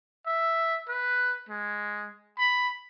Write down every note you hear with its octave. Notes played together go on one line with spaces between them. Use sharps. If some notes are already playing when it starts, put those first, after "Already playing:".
E5
B4
G#3
B5